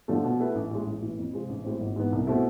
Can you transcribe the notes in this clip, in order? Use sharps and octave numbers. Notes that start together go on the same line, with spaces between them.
D3 F3 A3
B2
A3 E4 B4
A1
A2 G#3
A1
A2 E3
F2
C3 G#3 C4 F4
A1
A2 G#3 C4
G#1
G#2 E3 B3
C2
B2 A3 C4 E4